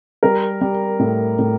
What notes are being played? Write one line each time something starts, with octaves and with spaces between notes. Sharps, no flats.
G3 A#4
G3
A2
A2